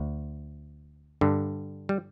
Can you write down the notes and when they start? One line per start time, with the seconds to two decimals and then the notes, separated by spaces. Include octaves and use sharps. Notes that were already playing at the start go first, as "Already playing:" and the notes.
Already playing: D2
1.21 G2 D3
1.89 G3